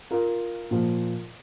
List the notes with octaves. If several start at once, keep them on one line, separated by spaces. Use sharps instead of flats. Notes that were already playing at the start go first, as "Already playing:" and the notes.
F4 A#4
A#2 F3